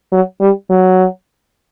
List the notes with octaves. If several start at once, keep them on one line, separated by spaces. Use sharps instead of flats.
F#3
G3
F#3